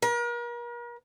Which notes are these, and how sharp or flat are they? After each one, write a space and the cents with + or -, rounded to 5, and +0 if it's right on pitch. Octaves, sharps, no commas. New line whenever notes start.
A#4 +40